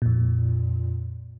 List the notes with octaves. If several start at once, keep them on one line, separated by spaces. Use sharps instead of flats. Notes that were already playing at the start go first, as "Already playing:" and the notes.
F2 A#2